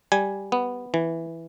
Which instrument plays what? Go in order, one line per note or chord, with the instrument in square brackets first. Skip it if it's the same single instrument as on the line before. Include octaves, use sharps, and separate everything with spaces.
[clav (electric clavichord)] G3 G#5
B3
E3